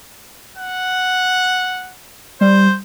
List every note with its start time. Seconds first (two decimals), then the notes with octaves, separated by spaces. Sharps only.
0.57 F#5
2.41 G3 C5